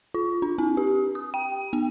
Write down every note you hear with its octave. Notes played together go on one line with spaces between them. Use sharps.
F4
D4
C4
G4
D#6
G5
B3